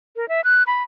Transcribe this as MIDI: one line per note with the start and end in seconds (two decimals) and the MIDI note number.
0.16 0.29 70
0.29 0.41 76
0.44 0.63 90
0.67 0.83 83